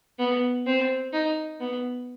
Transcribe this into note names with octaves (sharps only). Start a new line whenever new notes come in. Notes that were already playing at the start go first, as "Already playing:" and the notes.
B3
C4
D#4
B3